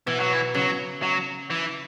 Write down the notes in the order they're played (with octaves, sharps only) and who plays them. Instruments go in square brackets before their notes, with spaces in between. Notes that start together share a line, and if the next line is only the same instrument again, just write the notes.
[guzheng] B2 [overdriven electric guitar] E3
[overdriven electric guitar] F#3
E3
[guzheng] C#3 [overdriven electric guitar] F#3
[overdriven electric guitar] F#3
E3